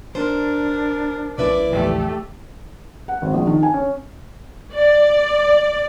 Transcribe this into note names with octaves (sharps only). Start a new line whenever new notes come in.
D4 A#4 C5
B1 C#4 E4 B4 D5 E5
A#1 E2 F3 A3 G4
F#5
G#1
A#1
D#3
G#5
C#4
D5